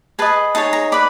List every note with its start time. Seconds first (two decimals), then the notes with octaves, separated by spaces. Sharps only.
0.19 G#4 B4 D#5 A5
0.55 D#4 G#4 C#5 A5
0.73 A#5
0.92 B4 D5 B5